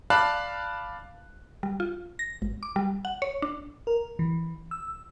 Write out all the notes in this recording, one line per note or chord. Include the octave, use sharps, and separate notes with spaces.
D5 F5 A5 B5 F#6
G3
F4
A#6
G#1
D6
G3
F#5
C#5
D4
A#4
E3
E6